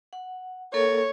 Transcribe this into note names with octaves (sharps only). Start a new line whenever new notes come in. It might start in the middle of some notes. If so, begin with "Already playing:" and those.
F#5
A#3 A4 A#4 C#5